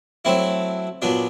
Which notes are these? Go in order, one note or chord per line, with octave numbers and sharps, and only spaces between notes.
F#3 A3 C4 E4
A#2 F#3 B3 D4